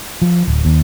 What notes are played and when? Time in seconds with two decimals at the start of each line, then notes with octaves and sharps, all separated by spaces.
0.22 F3
0.47 D1
0.65 D#2